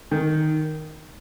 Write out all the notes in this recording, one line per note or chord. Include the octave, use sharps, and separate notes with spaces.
D#3